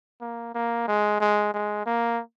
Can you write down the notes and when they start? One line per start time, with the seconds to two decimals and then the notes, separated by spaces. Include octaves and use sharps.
0.21 A#3
0.55 A#3
0.88 G#3
1.20 G#3
1.54 G#3
1.86 A#3